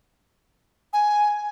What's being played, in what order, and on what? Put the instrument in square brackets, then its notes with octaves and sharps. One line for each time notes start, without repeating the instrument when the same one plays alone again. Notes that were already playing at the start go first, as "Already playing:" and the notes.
[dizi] G#5